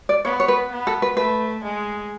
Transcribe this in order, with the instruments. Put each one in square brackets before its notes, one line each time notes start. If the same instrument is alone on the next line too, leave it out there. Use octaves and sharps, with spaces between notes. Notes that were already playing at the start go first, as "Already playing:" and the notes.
[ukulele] D5
[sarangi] B3 [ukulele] C#5
[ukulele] C#5
B4
[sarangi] B3
[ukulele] A4
B4
[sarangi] A3 [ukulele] B4
[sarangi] G#3